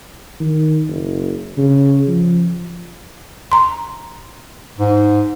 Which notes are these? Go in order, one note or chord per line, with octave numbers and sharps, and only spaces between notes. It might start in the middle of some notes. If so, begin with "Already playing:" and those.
D#3
F#1
C#3
F3
A#5 C6
G#2